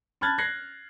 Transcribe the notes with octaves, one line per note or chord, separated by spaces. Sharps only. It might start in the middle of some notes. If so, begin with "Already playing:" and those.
A5 B5 F6 F#6 G#6 A6
F#6 G#6 A#6 C7